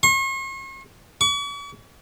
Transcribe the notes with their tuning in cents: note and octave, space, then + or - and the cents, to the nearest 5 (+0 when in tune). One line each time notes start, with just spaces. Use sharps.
C#6 -45
C#6 +45